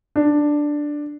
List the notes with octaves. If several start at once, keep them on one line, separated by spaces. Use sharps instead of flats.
D4